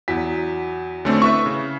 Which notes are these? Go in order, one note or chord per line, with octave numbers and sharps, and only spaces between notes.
E2 F#3 B6
D3 A3 C4 C#4
E4 B4 E5 C#6
C#3